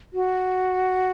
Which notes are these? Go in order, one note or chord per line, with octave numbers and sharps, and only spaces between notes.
F#4